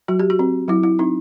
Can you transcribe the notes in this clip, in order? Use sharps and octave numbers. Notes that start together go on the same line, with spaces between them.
F#3 F#4
G4
F#4
C4
F#3 E4
E4
C4 D#4